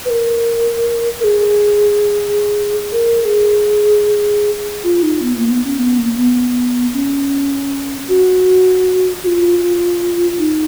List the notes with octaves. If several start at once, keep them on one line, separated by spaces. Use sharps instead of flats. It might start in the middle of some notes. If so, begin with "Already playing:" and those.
B4
A#4
A#4
G#4
A#4
A#4
G#4
F4
D#4
B3
A#3
B3
C#4
B3
A#3
B3
C#4
F#4
F#4
F4
D#4